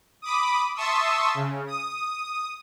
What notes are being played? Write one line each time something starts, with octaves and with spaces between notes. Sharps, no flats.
B5 D6 D#6
E5 A5 C6 C#6 D#6 E6
C#3
D#6